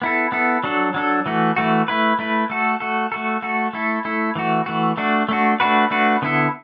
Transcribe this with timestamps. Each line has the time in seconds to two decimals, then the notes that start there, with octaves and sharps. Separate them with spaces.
0.02 B3 E4 A4
0.32 B3 E4 A4
0.64 F#3 D4 A4
0.94 F#3 D4 A4
1.26 E3 A3 F#4
1.56 E3 A3 F#4
1.88 A3 E4 B4
2.19 A3 E4 B4
2.50 A3 F#4 A4
2.80 A3 F#4 A4
3.12 A3 F#4 A4
3.42 A3 F#4 A4
3.73 A3 E4 A4
4.05 A3 E4 A4
4.35 E3 A3 F#4
4.66 E3 A3 F#4
4.97 A3 D4 F#4
5.29 A3 D4 F#4
5.60 A3 D4 F#4 B4
5.91 A3 D4 F#4 B4
6.22 D3 B3 E4 A4